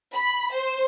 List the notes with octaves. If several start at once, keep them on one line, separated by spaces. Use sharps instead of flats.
B5
C5